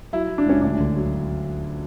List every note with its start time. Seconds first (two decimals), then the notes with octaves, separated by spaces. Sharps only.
0.13 F#3 E4
0.29 F#3
0.38 D4
0.46 C#2 C#4
0.62 D2 D4
0.80 D3
0.96 F#3